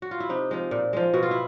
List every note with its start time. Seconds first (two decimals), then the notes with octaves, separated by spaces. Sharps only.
0.02 F#4
0.11 F4
0.20 E4
0.29 C3 D#4
0.51 F3 G#3
0.71 A#2
0.93 F3 G#3
1.14 B2 F#4
1.23 F4
1.31 E4